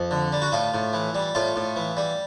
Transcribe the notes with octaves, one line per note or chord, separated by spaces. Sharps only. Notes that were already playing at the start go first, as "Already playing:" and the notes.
Already playing: F2
D3
G3
F#4
A2 F4
A2
E3
G3
A2 F4
A2
E3
G3